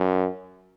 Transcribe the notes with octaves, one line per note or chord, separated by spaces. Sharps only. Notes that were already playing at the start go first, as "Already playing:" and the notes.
Already playing: F#2